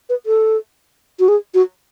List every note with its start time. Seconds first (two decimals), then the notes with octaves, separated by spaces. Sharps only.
0.09 B4
0.26 A4
1.19 F#4
1.28 G#4
1.54 F#4